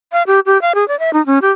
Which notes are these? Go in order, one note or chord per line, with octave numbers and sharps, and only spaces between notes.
F5
G4
G4
F5
G#4
D5
E5
D#4
C#4
G4